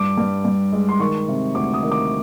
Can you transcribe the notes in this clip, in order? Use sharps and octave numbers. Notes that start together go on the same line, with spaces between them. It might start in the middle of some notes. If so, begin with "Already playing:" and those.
Already playing: G2 D6
G2
G2
G#3
C6
D#3 C#6
C3
D2 D6
D#6
D#3
D6